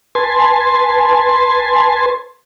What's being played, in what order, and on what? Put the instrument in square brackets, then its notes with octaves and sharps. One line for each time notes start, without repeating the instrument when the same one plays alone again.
[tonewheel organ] B4 G#5 A5 C6